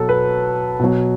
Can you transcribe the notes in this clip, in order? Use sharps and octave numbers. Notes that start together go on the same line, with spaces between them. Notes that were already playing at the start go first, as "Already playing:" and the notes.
Already playing: B2 F#3 A4
B4
B2 F#3